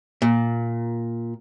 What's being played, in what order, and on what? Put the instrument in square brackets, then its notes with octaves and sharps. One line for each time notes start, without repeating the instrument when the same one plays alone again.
[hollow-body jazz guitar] A#2